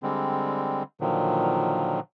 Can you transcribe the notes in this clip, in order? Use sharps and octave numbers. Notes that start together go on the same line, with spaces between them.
D3 G3 G#3 C4
A#2 D3 D#3 F3 F#3